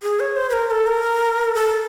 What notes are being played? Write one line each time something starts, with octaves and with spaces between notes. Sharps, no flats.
G#4
C#5
C5
B4
A#4
A4
A#4
A4